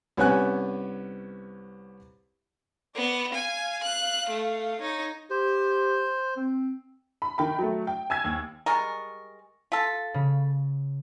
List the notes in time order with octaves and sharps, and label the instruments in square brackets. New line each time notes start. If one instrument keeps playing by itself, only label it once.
[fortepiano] C2 B3 C#4 G#5 F#6
[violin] B3 [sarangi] D5
[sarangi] F5 [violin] G#5
[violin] F#6
A3
[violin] D#4 [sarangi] C#5
[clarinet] G4 [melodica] C5
[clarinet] C4
[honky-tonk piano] B5
D#3 G5 B5
F#3 A3
G5
G#5 E6 G#6
D#2
[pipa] G3 G#3 A#4 [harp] C#6 A6
[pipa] F4 A4 [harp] B6
[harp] C#3